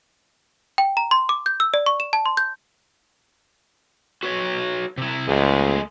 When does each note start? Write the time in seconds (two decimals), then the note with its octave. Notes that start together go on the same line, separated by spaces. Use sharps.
0.78 G5
0.97 A#5
1.11 C6
1.29 D6
1.46 G6
1.60 E6
1.74 D5
1.86 C#6
2.00 E7
2.13 A5
2.26 C6
2.37 G6
4.23 F#4 B4 C#5
4.98 C3 E4
5.28 C#2 G#3 A3 G#4